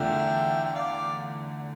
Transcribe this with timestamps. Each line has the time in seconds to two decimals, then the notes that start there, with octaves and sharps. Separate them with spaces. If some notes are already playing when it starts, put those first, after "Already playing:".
Already playing: E2 D3 A3 D4 F4 E5 G5
0.64 G5
0.74 D5 F5